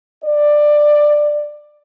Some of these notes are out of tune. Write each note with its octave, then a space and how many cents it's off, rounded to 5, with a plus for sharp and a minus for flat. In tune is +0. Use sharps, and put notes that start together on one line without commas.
D5 +15